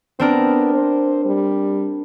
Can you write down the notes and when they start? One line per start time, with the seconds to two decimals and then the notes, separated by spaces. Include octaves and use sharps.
0.19 B3 C4 D4 A#4
0.74 C5
1.25 G3